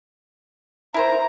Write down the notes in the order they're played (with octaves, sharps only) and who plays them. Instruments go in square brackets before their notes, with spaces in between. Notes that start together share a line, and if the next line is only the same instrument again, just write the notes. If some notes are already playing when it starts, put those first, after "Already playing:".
[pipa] E4 A#4 C5 [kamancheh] A#5